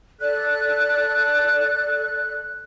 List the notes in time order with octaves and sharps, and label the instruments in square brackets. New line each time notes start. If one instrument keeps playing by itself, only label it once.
[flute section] A4 D5 F#6